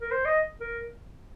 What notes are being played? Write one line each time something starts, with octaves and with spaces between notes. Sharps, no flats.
A#4
C5
D#5
A#4